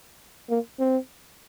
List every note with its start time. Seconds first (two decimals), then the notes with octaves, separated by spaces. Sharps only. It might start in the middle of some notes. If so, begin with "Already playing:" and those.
0.49 A#3
0.79 C4